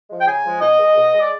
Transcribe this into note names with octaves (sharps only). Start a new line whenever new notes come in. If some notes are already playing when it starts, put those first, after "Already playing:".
F3 G#3
G5
C#3 G#5
F3 G#3
B2 D#5
G#3
B2
G#3
D5